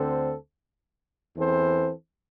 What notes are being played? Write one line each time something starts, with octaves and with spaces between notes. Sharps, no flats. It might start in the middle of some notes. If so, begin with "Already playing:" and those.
Already playing: D2 D3 C4 A4 C5
E2 E3 C4 A4 C5